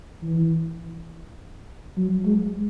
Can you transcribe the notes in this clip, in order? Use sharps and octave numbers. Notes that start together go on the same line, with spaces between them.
E3
F#3
G#3